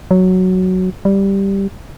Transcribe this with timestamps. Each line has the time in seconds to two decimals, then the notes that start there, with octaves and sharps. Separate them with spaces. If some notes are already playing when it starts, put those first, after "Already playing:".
0.11 F#3
1.05 G3